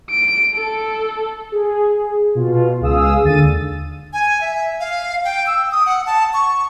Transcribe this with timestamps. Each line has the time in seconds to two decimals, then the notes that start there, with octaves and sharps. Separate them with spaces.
0.11 D7
0.55 A4
1.52 G#4
2.35 B2 F4
2.80 C#2 G#4 F5 D#6 E6
3.23 D#2 D3 A6 D#7
4.13 G#5
4.41 E5
4.80 F5
5.25 G5
5.47 E6
5.72 D#6
5.86 F#5
6.06 A5
6.34 C#6